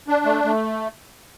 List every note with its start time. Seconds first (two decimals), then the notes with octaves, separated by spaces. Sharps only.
0.08 D4
0.25 A3
0.44 A3